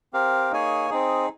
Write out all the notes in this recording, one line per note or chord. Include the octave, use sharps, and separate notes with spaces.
C4 G4 A#4 F5
A#3 D#4 G#4 C#5 G#5
C4 D#4 G#4